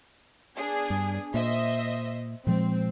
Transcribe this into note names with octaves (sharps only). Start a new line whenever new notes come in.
B3 D4 G#4
G2
A#2 C5 D#5 E5
A#2 F3 G#3 C4